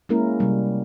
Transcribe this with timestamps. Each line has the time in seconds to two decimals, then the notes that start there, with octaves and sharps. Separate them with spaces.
0.09 G#3 A#3 C#4 E4 A#4
0.40 C3 G3